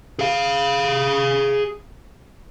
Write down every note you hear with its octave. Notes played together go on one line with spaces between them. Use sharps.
G#4 F5